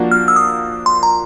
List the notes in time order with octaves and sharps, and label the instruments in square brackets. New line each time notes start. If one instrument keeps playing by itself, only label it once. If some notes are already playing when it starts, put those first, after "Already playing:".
Already playing: [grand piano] F3 A#3 D4 F#4
[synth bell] F6
E6
D#6
C6
A#5